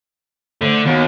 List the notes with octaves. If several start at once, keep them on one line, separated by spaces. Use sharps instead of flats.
D3 A3 C5
D#2 B3 F#4